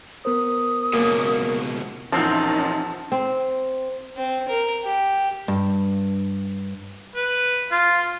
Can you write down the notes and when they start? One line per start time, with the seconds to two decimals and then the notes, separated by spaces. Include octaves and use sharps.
0.25 B3 A#4 C5 D#6
0.93 C#2 F#2 B2 A#3
2.12 A1 E2 A#2 F3 C4 C#4 D#4 A5
3.12 C4
4.16 C4
4.48 A#4
4.83 G4
5.48 G2
7.16 B4
7.72 F4